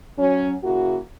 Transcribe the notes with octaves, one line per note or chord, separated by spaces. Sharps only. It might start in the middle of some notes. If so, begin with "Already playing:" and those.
F#3 C#4
C#3 A#3 E4 F#4